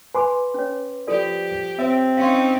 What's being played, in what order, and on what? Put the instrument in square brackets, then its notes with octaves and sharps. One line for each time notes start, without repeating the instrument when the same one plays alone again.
[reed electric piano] B4 C6 D6 [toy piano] G#5 B5
[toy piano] C#4 C#5
[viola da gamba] F3 G4 [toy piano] F4 A4 D5
[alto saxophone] C4 [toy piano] C#5 [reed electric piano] E5
[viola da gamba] C#4 D#4 [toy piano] F5 C6